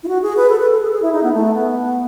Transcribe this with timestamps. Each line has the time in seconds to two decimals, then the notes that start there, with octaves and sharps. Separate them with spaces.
0.03 E4
0.08 F#4
0.22 G#4
0.37 B4
0.49 A4
0.60 B4
0.71 A4
0.81 G#4
0.92 G#4
1.02 E4
1.13 D#4
1.23 B3
1.33 A3
1.54 B3